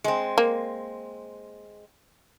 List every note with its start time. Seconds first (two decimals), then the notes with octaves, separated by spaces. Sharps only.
0.04 G#3 C4
0.38 A#3